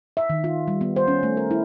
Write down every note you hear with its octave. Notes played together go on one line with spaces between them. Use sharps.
E5
D#3
F4
G3
B3
C5
C#4
A3
A#4
E4